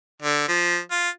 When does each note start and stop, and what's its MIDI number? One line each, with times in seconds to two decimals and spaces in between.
0.22 0.46 50
0.48 0.78 53
0.91 1.09 65